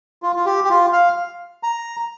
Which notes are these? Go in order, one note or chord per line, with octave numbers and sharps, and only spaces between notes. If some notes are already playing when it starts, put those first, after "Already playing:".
F4
F4
G4
G4
F4
F5
A#5